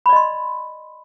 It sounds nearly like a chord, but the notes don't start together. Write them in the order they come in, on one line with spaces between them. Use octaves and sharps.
B5 D5 D#5 C6